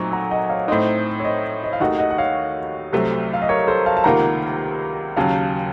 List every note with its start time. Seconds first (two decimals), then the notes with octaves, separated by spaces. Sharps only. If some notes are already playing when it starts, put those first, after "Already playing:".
Already playing: A#2 F#3 A3 C4 D#4 A#5 C#6
0.12 F#5 A#5
0.31 D#5 F#5
0.49 C#5 F5
0.68 A2 A3 C4 D#4 C5 D#5
1.20 C#5
1.25 C5 D#5
1.64 D#5
1.73 F5
1.80 D#2 D#3 A3 D#4 F#4 D#5 F#5
1.99 D#5 F#5
2.10 F#5
2.18 C#5 F5
2.92 C2 C3 F#3 A3 C4
3.33 F5
3.42 D#5
3.49 A#4 C#5
3.68 A4 C5
3.86 F5 A5
3.97 A5
4.04 C#2 C3 D#3 A#3 F4 F#5 A#5
5.16 D#2 C#3 F#3 F5 A5